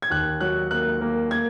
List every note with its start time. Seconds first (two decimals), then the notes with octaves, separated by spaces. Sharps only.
0.02 G#6
0.10 D#2 F#6
0.41 F#3 F#6
0.71 A#3 F#6
1.01 A#3
1.31 A#3 G#6